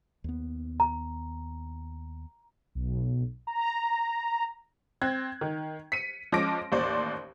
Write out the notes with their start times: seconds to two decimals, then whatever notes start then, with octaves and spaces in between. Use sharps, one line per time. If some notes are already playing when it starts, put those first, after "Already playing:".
0.24 D#2 B3
0.80 A#5
2.75 B1
3.47 A#5
5.02 C4 F#6 G#6
5.41 D#3
5.92 B6 C#7 D#7
6.32 F3 G#3 C#4 D6 A#6 D7
6.72 A1 D#2 C5 D5 C6